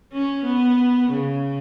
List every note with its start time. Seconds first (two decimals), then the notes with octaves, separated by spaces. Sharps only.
0.13 C#4
0.45 B3
1.11 C#3